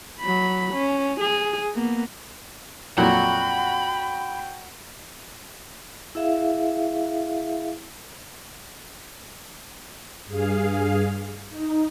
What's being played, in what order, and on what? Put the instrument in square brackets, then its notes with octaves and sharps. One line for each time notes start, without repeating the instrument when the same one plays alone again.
[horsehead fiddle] F#3 B5
C#4
G#4
A#3 B3
[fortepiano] F2 A#2 F#3 [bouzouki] F#4 [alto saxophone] G5 [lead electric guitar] B5
[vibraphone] E4 G#4 E5 F5
[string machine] G2 G#4 F5
D#4